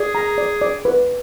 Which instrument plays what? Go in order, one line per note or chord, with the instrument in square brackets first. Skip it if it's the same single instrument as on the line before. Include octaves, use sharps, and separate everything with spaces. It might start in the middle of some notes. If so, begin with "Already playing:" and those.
Already playing: [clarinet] G#4 [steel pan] D5
[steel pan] A#5
D5
D5
B4